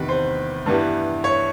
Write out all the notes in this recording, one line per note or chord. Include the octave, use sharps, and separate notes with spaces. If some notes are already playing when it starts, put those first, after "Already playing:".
Already playing: E2 C3 D#3 G3 B4
C5
G2 E3 G3 B3
C#5